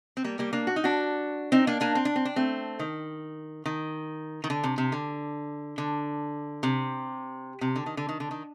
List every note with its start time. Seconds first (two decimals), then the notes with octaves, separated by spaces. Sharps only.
0.17 C4
0.24 G3 A#3
0.39 G3 A#3
0.53 A#3 D4
0.67 F#4
0.76 D#4
0.84 D4 F#4
1.52 C4 D#4
1.67 A#3 D4
1.81 A#3 D4
1.95 C4
2.05 D4
2.16 C4
2.25 D4
2.36 A3 C4
2.79 D#3
3.66 D#3
4.44 D#3
4.50 D3
4.64 C3
4.78 C3
4.92 D3
5.78 D3
6.63 C3
7.61 C3
7.76 D3
7.86 D#3
7.97 D3
8.09 D#3
8.20 D3
8.31 D#3